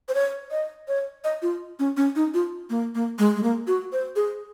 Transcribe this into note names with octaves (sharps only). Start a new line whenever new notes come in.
C5
C#5
D#5
C#5
D#5
F4
C#4
C#4
D#4
F4
A#3
A#3
G#3
G#3
A#3
F#4
C5
G#4